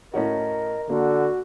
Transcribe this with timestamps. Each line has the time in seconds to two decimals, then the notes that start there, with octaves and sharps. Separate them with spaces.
0.14 A2 C#4 F#4 A#4 D#5
0.89 D3 A#3 F#4